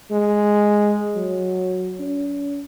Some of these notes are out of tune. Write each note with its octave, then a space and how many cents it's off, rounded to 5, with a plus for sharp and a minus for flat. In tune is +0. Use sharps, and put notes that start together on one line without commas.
G#3 +0
F#3 -10
C#4 +40